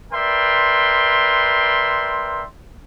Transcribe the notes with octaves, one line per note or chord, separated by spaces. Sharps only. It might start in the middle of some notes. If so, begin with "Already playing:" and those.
A#4 B4 D5 E5 G5 C6